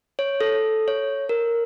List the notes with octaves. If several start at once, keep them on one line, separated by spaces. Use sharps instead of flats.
C#5
A4
C#5
A#4